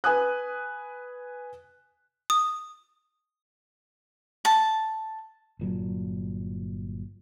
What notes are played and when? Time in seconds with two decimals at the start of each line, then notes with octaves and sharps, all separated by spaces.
0.04 B4 G#5 D#6 F#6
2.30 D#6
4.45 A5
5.59 G1 A#2 F#3